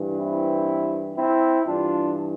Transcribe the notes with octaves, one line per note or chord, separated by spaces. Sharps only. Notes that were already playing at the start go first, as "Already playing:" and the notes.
Already playing: G2 E3
C4 E4
C4 E4
G2 E3 D4 F4